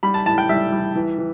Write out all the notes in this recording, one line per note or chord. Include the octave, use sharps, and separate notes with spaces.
G3 B5
A5
A2 A5
G5
G3 E5
G3
E3
E3